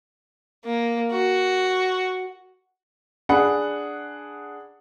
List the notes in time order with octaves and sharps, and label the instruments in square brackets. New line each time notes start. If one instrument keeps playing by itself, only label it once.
[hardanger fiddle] A#3
F#4
[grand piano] D4 G#4 F#5 B5